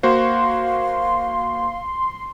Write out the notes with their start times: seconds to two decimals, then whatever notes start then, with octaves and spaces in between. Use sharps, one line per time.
0.03 A#3 F#4 C5 F5 C6